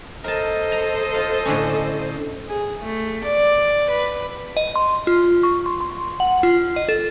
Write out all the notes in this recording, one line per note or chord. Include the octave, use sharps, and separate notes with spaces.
A4 A#4 C5 D#5 A5
A#5
F4 F5
A2 D3 C#4
G#4
A3
D5
B4
D#5
C6
F4
C#6
C6
C6
F#5
F4
D#5
A4